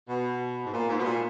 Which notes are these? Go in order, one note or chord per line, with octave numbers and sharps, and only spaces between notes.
B2
G#2
A#2
G#2
B2
A#2